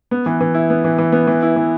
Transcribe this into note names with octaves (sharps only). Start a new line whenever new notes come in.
B3
E3
E3
E4
B3
E3
E3
B3
E3
E4
E3